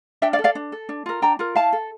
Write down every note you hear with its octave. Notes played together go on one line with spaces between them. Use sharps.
D4 E5 G5
D5 F5
A4
D5 F5
D4
A4
D4
F4 A#4
D4 G5 A#5
F4 A#4
E4 F5 A5
A4